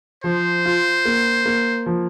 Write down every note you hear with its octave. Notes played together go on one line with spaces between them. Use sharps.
F3 C5
F4
A#3
A#3
F3